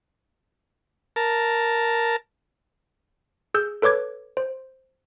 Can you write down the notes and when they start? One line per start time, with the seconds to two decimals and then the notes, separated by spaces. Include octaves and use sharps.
1.16 A#4 A5
3.54 G#4 E6 G6
3.82 A4 B4 C#5 D6 G#6
4.37 C5